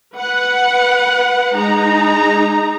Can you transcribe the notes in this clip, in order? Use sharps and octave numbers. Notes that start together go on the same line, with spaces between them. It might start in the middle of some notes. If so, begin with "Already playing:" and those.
B4 F#5
G#3 D#4 A#5